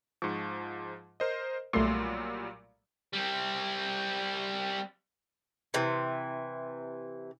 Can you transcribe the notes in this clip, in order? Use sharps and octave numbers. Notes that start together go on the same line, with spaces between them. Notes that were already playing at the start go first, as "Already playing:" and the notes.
G#2 F3 C#6
A#4 C5 D#5
B1 A#2 F#3 G3 A3 C6
G3 C4
C3 E3